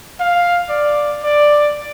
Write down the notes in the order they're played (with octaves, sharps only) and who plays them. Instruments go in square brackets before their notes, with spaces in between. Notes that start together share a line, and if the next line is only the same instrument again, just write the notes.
[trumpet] F5
D5
D5